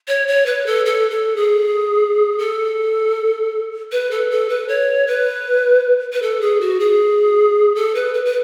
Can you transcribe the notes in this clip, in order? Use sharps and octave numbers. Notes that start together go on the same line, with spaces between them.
C#5
C#5
B4
A4
A4
A4
G#4
A4
B4
A4
A4
B4
C#5
B4
B4
A4
G#4
F#4
G#4
A4
B4
B4
B4